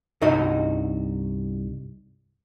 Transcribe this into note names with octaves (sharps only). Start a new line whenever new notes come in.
C2 G2 D#4 F#4 D#5